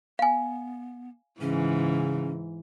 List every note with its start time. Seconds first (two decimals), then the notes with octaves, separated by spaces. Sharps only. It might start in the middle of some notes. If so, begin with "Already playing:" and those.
0.19 B3 F5 G#5
1.41 G#2 C#3 E3 C#4